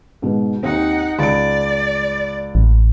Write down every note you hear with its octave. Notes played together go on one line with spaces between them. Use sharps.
G#2 B2
D#2 C4 D#4 F#5
C#2 D5 D7
A1